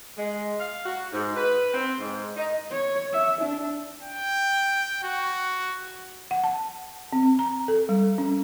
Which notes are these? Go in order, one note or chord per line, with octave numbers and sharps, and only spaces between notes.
G#3
F5
F#4
G#2
B4
C4
G#2
D#4
C#5
E5
D4
G5
F#4
F#5
A5
C4
A#5
A4
G3
C#4